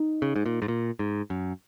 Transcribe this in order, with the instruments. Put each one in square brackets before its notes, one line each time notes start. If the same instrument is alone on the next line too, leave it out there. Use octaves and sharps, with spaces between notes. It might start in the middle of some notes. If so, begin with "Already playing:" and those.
Already playing: [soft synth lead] D#4
[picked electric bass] C#3
G#2
A#2
G#2
A#2
G#2
F#2